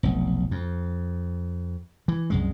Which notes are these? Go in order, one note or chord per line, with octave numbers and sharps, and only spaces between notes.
F1 B1
F2
E3
C2 F#2 G#3